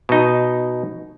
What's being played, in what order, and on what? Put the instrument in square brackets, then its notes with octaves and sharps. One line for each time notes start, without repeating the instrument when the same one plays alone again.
[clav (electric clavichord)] B2 D#4